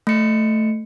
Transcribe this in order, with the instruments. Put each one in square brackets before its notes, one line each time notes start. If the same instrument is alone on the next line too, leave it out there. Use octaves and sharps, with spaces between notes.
[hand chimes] A3 C#7